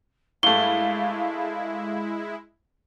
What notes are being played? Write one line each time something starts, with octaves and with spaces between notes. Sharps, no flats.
G2 G#3 A3 E4 F5 G7